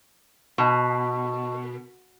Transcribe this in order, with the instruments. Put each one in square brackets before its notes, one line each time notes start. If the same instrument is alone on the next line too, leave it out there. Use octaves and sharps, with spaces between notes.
[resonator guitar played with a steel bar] B2 [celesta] D#5 A5 C#6